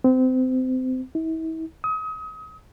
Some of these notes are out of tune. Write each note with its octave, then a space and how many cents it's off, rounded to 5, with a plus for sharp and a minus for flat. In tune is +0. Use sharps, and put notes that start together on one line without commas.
C4 -30
E4 -40
D#6 +35